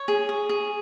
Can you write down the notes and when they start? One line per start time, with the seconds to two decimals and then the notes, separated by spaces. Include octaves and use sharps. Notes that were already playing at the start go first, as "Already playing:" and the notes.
Already playing: C#5
0.08 G#4
0.29 G#4
0.49 G#4